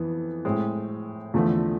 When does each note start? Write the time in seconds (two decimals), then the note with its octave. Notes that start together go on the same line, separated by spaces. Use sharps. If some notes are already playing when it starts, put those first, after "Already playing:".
Already playing: F2 E3 B3
0.45 A2 G#3 C4
1.34 E2 D3 F3 A3